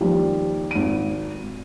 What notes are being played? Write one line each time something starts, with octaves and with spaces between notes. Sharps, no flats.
D#2 F3 G3
G#1 D#7